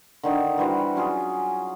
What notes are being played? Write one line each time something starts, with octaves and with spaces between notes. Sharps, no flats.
D3 D#3 D#4
E3 G3 F#4 C5
F#3 C#4 F4 G#4